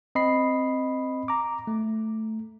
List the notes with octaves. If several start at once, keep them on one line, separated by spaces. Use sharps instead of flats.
C4 D#5 B5 C7
A#5 D6
A3